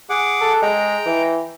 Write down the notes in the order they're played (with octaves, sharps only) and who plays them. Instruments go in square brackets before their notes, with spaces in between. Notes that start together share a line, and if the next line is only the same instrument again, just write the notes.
[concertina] G#4 F#5 D6
[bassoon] A4
[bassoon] G#3 [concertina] G5 A#5
[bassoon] E3